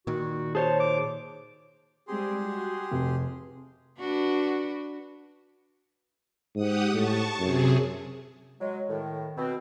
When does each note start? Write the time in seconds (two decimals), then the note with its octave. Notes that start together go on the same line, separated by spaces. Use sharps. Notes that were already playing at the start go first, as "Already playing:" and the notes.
0.07 A#2 D#3 F#4
0.55 G#4 C5 C#5 A5
0.80 D6
2.08 G3 G#3 C4 G4 G#4 C6
2.44 F#4
2.91 F1
3.99 D4 F#4 B4
6.55 G#2 G4 F#5 D#6
6.94 A2 A5 C#6
7.39 F#2 C3 G#4
8.61 F#3 G#3
8.90 A2 D#3
9.37 B2 C4